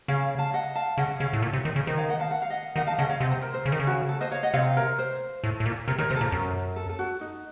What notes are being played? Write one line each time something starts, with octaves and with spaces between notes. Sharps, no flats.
C#3 C#5 F5
F5 A5
D#5 F#5
F5 A5
C#3 D#5 F#5
C#3 C#5 F5
A2
A#2
C3
D#3
C#3
D#3 C5 D#5
C#5 F5
D#5 F#5
F5 A5
F#5
F5
D#5 F#5
D#3 D#5 F#5
F5 A5
C#3 D#5 F#5
C#5 F5
C3 C5 D#5
C5
A#4
C5
C#3
D#3
C#3
F#4
A4
C5 D#5
C#5 F5
D#5 F#5
C3 C#5 F5
A#4 C#5
C5
A2
A2
A#2
C3 A#4 C#5
D#3 A#4 C#5
C3 C5
A4
A#2 A#4
F#2
A4
A4
F#4
D#4